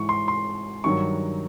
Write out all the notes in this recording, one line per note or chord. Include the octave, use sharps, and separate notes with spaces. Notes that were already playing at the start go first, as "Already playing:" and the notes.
Already playing: G#2 E3 C#6
C6
C6
G2 D#3 F#3 C#6